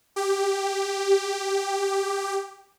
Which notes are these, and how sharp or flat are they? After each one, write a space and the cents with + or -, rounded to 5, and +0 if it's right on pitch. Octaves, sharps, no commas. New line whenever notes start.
G4 +5